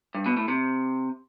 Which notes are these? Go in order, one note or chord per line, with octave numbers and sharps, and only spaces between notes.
G2
B2
A2
C3